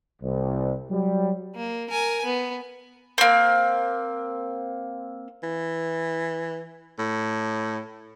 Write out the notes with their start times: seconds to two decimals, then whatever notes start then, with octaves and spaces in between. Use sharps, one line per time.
0.22 C2
0.90 F#3 G3
1.56 A#3
1.90 A#4 G#5
2.26 B3
3.18 A#3 C4
5.43 E3
6.99 A2